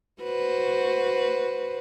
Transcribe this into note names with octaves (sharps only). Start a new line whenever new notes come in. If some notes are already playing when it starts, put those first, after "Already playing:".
F#4 B4 C5